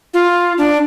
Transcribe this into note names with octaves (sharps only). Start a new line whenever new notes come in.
F4
D4